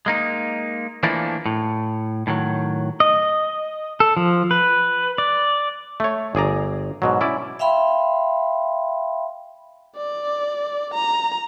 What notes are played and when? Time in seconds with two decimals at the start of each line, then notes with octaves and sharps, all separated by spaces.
0.06 G#3 A#3 D#4
1.03 E3 F3 A3 A#3 D4
1.46 A2
2.27 A2 D#3 F#3
3.00 D#5
4.00 A4
4.17 F3
4.51 B4
5.18 D5
6.00 A3 C#5
6.35 G1 G#4 D5 A#5
7.02 G#2 B2 F#3
7.21 C#4 E4 D5
7.59 E5 F5 G5 B5 C6
9.97 D5
10.94 A#5